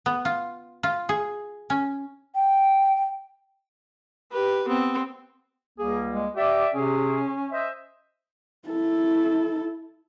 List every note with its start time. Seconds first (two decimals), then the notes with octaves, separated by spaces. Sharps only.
0.06 B3
0.25 F4
0.83 F4
1.09 G#4
1.70 C#4
2.35 G5
4.32 G4 B4
4.68 B3 C4
5.79 C#2 G3 A#3 G#4
6.13 G#3
6.36 G4 D5 E5
6.74 C3 C#4 G#4
7.51 C5 D#5 E5
8.68 E4 A4